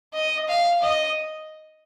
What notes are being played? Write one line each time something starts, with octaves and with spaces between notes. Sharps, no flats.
D#5
F5
D#5